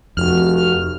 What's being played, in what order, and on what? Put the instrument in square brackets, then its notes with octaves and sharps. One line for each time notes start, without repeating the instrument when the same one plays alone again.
[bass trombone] F1 [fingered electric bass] F2 [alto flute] F#4 [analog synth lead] F6